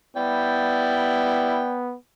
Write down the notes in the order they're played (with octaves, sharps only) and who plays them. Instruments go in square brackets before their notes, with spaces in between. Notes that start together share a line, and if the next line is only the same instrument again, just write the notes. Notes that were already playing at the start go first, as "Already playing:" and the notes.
[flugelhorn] B3 [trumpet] E4 [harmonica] D5 G5